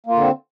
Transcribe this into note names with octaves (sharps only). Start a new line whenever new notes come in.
D3 A#3 C4 F4